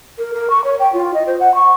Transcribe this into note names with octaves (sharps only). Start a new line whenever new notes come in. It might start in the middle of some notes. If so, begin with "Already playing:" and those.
A#4
A#4
C#6
C#5
G5
F4
D#5
C5
F#5
C#6